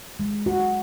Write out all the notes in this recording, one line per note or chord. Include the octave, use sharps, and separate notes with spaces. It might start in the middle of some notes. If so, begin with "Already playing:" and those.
G#3
F#4